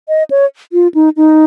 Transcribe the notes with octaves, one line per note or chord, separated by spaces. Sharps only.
D#5
C#5
F4
D#4
D#4